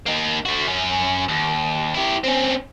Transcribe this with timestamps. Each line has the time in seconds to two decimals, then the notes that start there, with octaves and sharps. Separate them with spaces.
0.06 A#3 D#4
0.46 A3 F#4
0.67 F#2 C#4
1.28 D#2
1.95 E4 G4
2.24 C4 C#4